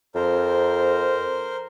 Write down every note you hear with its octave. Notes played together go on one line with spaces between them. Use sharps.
F2 A#4 C5